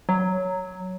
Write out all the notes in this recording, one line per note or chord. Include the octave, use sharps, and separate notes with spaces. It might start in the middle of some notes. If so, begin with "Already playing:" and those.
F#3